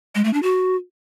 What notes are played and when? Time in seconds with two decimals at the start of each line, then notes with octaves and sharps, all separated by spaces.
0.15 G#3
0.24 A3
0.33 D4
0.43 F#4